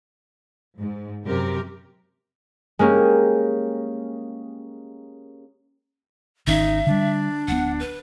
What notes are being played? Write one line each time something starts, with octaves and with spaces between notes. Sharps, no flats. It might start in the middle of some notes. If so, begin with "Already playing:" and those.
G#2
F#2 C3 G4 A#4
G#3 A#3 C#4 G4
G#1 D#3 C#4 D#4 E5
D3 G3 D4
D1 B3 F#5
B4